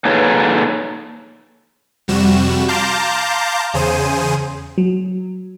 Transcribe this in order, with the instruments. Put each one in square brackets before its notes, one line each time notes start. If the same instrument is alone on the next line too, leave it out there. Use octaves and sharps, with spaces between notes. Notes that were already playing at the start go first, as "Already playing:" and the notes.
[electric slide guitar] A#3 D#4 G#4 A4 B4 C#5
[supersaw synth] F2 C3 G3 F#4 E7
F5 A5 A#5 C6 D6 G6
E2 C#3 G#4 C5 D#7
[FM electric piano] F#3